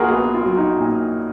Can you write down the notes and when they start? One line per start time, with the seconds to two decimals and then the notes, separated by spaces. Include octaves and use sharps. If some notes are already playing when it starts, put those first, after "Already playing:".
Already playing: A#1 A#2 F4 F#4 G#4 A#4
0.11 B3 F#4
0.34 F4
0.46 F#3
0.58 D#4
0.80 A#2